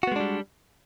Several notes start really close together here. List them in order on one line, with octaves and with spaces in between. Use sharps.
F#4 B3 G#3 D4 G3